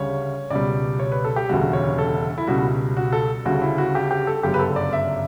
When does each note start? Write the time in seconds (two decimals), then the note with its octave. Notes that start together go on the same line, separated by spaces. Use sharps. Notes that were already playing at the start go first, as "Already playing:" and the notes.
Already playing: D2 C#3 G3 C#5
0.50 C#2 B2 G3 D5
1.00 C#5
1.12 B4
1.24 A4
1.36 G4
1.49 E1 D2 C#3 G3 F#4
1.73 C#5
1.98 A4
2.38 E4
2.47 C#2 B2 G3 F#4
2.97 F#4
3.13 A4
3.45 D2 C#3 G3 F#4
3.61 E4
3.78 F#4
3.95 G4
4.11 G4
4.27 A4
4.43 G1 F#2 C#3 F#3 G4
4.54 B4
4.59 A4
4.76 D5
4.93 E5